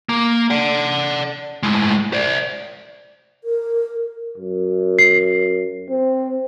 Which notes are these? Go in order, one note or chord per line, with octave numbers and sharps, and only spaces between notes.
A#3
D5 F#5
A2 G#3
C5 D5
A#4
F#2
C7
C4